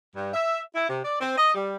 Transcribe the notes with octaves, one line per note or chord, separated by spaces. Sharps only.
G2
E5
E4
C3
D5
C4
D#5
G3